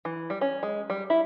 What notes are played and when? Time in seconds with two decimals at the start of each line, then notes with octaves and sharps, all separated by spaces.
0.05 E3
0.30 G3
0.41 C#4
0.63 G#3
0.90 G3
1.10 E4